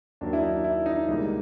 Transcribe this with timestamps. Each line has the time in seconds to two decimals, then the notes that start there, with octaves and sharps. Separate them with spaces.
0.21 D#2 D#3 F#3 A#3 D4
0.33 E4
0.43 D#4
0.64 E4
0.86 D#4
1.08 C#2 B2 G3 A#3 D#4